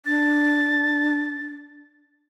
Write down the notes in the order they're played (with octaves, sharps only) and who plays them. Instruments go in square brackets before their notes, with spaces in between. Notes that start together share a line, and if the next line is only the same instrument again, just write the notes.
[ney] D4 [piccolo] A6